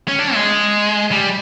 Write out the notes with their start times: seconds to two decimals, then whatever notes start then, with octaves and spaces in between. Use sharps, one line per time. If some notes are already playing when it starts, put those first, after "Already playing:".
0.08 C#4
0.19 D4
0.34 G#3
1.11 G3